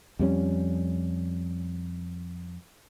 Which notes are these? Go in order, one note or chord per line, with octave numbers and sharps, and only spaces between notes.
F2 G3 C#4